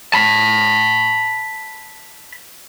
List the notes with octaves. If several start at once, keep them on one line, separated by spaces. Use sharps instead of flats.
A5 B5